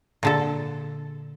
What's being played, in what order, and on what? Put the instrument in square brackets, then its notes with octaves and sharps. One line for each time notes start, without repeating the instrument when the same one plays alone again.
[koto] A#2 D3 A4